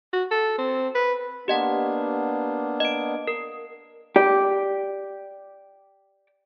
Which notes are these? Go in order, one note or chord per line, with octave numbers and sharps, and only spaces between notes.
F#4
A4
C4
B4
A#3 B3 D4 G4 D#5 F#5
D#5 D7
A#4
G4 D5